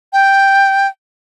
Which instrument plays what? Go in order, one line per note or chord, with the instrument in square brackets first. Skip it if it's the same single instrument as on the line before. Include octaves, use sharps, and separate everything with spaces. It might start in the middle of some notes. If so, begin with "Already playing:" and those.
[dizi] G5